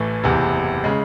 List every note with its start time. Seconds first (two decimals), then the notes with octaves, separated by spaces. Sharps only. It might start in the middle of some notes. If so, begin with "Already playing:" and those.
Already playing: A1 A2 E3 A3
0.23 F#1 E2 C3
0.84 C#3 G#3